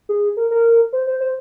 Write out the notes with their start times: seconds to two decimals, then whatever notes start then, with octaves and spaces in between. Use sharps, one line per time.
0.09 G#4
0.37 A#4
0.51 A#4
0.93 C5
1.07 C5
1.20 C5